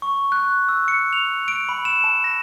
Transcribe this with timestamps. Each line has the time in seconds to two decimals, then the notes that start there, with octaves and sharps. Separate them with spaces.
0.02 C#6
0.32 F#6
0.68 E6
0.88 C#7
1.13 F7
1.48 D7
1.69 B5
1.85 E7
2.04 A5
2.24 A#6